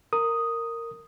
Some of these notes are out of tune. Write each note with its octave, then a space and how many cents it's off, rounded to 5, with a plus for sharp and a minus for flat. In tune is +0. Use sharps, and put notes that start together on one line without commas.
A#4 -15 D#6 +0